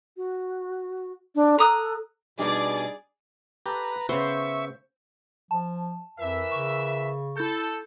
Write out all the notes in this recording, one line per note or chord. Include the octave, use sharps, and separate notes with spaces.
F#4
D4
A4 A#5 D#6 F#6
B2 G3 D4 D#4 G#4 D5 D6
G4 A4 B4 A#5
C#3 B3 B4 C5 E5 C#6
F3 A5
F2 E3 A#4 E5
C#3 C#6
E4 A4 G6